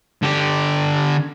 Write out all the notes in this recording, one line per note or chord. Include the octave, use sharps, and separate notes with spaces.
D3 G4